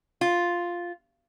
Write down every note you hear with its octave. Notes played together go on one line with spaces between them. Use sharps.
F4